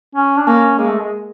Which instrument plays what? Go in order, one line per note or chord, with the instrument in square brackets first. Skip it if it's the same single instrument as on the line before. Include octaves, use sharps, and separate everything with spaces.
[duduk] C#4
D4
[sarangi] A#3 [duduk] C#4
[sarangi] G#3 [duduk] A#3
[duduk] A3
G#3